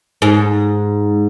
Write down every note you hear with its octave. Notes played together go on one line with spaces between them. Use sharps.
G#2